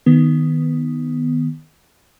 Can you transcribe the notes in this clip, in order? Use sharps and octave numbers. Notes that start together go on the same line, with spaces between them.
D#3 B3